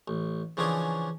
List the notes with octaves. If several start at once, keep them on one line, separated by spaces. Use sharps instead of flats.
A1
C#3 E3 F3 C#4 D4 G#4